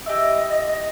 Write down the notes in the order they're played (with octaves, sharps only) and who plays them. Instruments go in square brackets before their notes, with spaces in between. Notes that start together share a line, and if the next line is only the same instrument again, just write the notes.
[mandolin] E4 G4 [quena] D#5